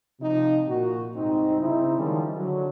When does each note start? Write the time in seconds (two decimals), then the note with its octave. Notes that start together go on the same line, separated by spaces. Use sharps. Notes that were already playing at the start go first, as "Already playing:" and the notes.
0.20 C3 F3 D#4
0.68 A#2 F#4
1.16 C2 G#2 C4 D#4
1.61 C#3 C4 D#4 E4
1.98 D#3 F3 G3 G#3 C#4 D#4
2.35 D3 F#3